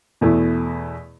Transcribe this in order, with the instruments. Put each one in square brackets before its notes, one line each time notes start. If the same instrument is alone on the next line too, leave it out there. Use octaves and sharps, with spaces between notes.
[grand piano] E2 B2 A3 E4